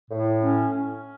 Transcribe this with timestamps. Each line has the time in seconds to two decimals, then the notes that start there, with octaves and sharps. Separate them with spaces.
0.10 A2
0.42 C#4
0.74 C#4